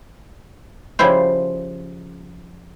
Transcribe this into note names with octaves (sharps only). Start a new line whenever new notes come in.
C#3 F3 G3 E4 C5